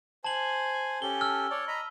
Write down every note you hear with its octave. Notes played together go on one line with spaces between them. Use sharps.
C5 G#5 A5 F#7
C#4 G4 A4 G7
E6 F6
C#5 D5
D#5 A#5 B5